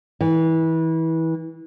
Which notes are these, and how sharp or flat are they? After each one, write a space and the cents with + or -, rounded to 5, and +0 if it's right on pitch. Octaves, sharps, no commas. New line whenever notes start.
E3 -25